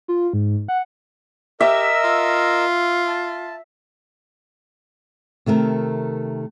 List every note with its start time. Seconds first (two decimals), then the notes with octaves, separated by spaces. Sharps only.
0.08 F4
0.33 G#2
0.68 F#5
1.61 G4 A#4 D#5 E5 E6
2.04 F4
3.08 A5
5.46 C3 D#3 A3 A#4